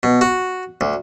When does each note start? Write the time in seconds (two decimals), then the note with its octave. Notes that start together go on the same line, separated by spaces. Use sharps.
0.03 B2
0.21 F#4
0.81 D2